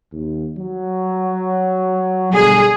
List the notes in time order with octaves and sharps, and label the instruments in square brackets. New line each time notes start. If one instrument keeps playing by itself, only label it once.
[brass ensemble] D#2
F#3
[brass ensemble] B2 D3 G3 [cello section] G#4